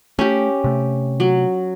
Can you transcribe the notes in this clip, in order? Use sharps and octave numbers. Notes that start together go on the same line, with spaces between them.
A3 C#4 G4
C3 A3
F#3